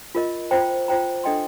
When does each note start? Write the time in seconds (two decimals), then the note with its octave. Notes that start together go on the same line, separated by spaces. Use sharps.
0.15 F4 A#4 D#5
0.51 F4 C5 G5 A#5
0.88 F4 C5 G5 A#5
1.24 D4 A4 D#5 G5 C6